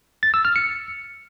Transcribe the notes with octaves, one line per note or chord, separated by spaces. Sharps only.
A6
E6
F6
C#7